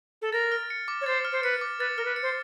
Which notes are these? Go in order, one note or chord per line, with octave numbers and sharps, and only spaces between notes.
A4
A#4 A6
F6
C#7
D6
C#5
C5 A6
F6
C5
B4 C#7
D6
B4 A6
A#4 F6
B4
C#7
C5